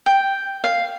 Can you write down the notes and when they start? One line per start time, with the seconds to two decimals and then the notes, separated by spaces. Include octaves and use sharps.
0.06 G5
0.64 F5